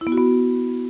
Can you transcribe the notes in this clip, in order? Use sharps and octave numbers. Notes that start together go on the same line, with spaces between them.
E4
B3
F#4
B3